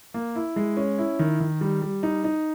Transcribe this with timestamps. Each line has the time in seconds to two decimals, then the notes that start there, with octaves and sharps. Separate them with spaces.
0.14 A#3
0.35 E4
0.56 G#3
0.77 C#4
0.98 E4
1.19 D#3
1.40 D#3
1.61 G3
1.82 G3
2.03 D#4
2.24 D#4